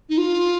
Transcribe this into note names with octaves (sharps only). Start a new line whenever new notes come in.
D#4
F4